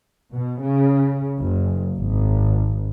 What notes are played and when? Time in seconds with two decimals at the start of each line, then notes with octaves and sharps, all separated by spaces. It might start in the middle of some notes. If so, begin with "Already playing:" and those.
0.33 B2
0.63 C#3
1.40 F#1
1.97 G#1